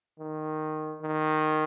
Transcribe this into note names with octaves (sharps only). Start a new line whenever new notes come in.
D#3
D#3